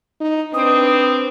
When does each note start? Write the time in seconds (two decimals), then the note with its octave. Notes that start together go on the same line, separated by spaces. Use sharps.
0.21 D#4
0.54 C4 D4 B4 D#6